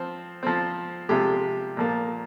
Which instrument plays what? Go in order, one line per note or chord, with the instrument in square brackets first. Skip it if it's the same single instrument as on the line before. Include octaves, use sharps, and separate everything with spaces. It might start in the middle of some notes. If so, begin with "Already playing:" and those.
Already playing: [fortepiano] F3 C4
F3 C4
C3 F3 G#3 G4
A#2 F3 A#3